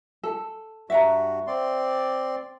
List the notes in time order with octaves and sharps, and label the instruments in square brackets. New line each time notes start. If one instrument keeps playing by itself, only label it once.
[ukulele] A4
[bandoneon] G2 F#4 [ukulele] E5 F#5 A#5
[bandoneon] C4 D5 C6